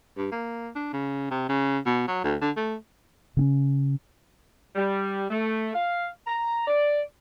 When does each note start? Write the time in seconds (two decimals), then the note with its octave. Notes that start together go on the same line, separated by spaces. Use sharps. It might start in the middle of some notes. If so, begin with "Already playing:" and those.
0.17 G2
0.32 A#3
0.75 D4
0.93 C#3
1.31 C3
1.49 C#3
1.86 B2
2.08 F#3
2.24 D2
2.41 D3
2.57 A3
3.37 C#3 C4 C#4
4.75 G3
5.29 A3
5.73 F5
6.27 A#5
6.66 D5